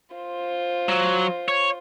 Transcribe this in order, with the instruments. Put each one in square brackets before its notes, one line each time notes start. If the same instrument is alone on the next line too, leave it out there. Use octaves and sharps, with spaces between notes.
[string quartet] F4 C5
[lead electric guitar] F#3
C#5